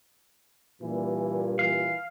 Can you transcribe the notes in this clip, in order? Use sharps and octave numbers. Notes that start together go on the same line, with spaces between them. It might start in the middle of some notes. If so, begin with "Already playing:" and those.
G2 A#2 E3
E3 F5